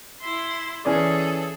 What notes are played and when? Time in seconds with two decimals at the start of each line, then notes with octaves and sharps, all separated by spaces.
0.21 E4 C6
0.85 E3 C#4 G#4 A4 D5